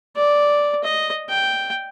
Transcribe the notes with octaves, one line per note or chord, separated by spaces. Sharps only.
D5
D#5
G5